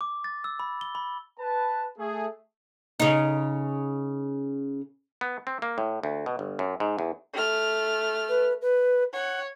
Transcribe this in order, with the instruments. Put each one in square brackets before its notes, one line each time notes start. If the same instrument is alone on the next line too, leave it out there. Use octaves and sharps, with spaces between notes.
[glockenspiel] D6
A6
E6
B5
G7
B5
[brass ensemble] B4 A5
A3 G#4
[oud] C#3 D#4
[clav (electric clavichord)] B3
C4
A#3
A2
D2
B2
G1
F#2
G#2
E2
[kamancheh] A3 F6
[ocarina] B4
B4
[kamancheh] C#5 [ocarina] F#5